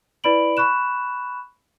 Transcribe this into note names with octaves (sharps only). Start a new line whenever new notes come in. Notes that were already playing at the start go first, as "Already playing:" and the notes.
E4 B4 D5 B5 D7 F#7
B5 C#6 F#6 E7